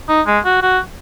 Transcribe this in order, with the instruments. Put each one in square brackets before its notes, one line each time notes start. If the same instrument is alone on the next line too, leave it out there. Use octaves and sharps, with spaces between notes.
[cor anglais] D#4
G#3
F#4
F#4